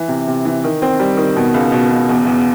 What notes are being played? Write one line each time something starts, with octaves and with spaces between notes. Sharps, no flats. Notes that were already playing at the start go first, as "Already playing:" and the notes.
Already playing: E3
C3
C3
E3
D#3
C4
G3
D#3
B2
C#2
B2
C#2
E2
E2